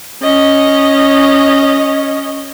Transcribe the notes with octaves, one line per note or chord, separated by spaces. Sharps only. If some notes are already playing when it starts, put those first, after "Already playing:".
C#4 D#5